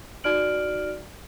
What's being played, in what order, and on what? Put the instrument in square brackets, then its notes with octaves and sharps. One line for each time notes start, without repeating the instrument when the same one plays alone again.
[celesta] D#4 F#4 D5 F6 D7 F#7